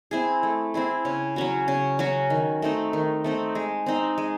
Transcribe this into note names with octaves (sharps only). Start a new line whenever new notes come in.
C4 E4 G#4
A3
C4 E4 G#4
C#3
F#3 C#4 F#4
C#3
F#3 C#4 F#4
D#3
A3 C4 D#4
D#3
A3 C4 D#4
G#3
C4 D#4
G#3